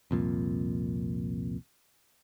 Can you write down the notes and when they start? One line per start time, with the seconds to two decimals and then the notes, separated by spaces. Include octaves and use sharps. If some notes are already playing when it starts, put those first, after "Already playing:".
0.11 C2 F2 A#2